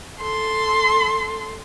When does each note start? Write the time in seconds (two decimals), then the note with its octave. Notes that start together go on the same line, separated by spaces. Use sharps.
0.21 A4 C6